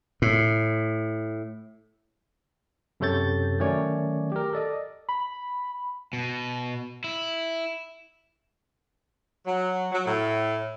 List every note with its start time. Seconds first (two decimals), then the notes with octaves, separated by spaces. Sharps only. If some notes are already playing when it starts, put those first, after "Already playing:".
0.22 A2
3.00 F#2 C3 A4 C#5 G6 A6
3.59 D#3 F#3 A3 C#4 C#5 D5
4.32 G4 A#4
4.53 A4 D5 D#5
5.09 B5
6.13 B2
7.04 E4
9.46 F#3
9.92 F#3
10.06 A2